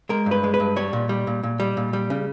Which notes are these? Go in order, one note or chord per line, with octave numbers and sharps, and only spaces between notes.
G#3 A#4
G2
B4
G#3
B4
G2
G3 C#5
A#2
G3
A#2
A#2
G3
A#2
G3
C#3